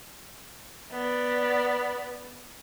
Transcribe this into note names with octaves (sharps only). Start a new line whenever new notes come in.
B3 D5